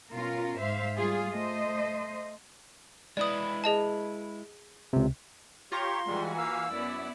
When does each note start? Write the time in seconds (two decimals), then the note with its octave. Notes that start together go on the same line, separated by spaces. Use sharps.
0.10 B2 C#4 F4 A#4
0.60 G#2 C5 E5 F5
0.96 G3 F4 G#4
1.31 A3 C5 D#5
3.17 G#3 E4 B4 D5 D#6
3.64 G#4 D#5 A5
4.93 C#2 C3
5.72 F4 G4 C#5 A#5 C6
6.07 E3 G3 G#3 F#4 G#5
6.38 A#3 F5 E6
6.70 F#2 B3 E4 D5